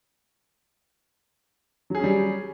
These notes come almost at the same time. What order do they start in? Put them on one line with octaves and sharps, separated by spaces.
F#3 G#4 C#4 G3